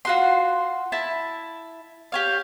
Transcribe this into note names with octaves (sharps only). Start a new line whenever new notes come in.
F4 F#4 C6
E4 A5
G4 C#5 F5